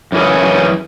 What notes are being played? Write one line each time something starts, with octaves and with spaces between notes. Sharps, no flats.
F#2 E3 C#4 G#4